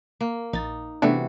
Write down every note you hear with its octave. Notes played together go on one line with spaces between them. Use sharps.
A#3
A#1 D#4 A6
C3 E3 A3 B3 D4 F#4